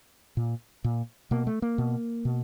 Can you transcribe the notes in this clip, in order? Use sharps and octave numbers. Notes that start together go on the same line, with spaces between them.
A#2
A#2
B2 A#3
A3
A#3
B2
B2